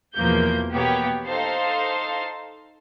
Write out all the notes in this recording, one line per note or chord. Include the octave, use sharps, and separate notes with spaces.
E2 B2 F3 A#3 A#4 G6
B2 A#3 B3 G4 C#5
D#4 A4 C5 F5 A5 C6